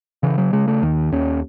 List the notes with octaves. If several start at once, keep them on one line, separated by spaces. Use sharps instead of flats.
C#3 E3
F#3
C#3 G#3
A3
D#2 D#3
D#2 C#4